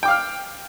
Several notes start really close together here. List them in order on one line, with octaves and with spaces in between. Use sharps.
G5 D6 F5 F6